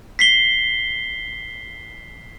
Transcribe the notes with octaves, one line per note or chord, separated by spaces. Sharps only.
B6 C7 G7